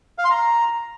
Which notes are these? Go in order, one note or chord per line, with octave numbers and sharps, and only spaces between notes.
F5
C6
A#5